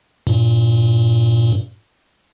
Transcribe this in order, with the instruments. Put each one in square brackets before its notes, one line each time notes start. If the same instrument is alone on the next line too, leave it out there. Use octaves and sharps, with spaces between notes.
[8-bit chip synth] G2 A#2